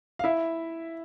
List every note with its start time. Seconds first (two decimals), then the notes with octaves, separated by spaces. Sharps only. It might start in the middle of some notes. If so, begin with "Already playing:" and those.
0.19 F5
0.24 E4 E5